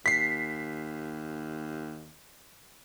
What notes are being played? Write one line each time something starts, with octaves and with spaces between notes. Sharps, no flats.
D#2 B6 C7